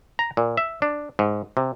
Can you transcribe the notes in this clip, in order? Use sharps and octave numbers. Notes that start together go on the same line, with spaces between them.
A#5
A#2
E5
D4
G#2
C3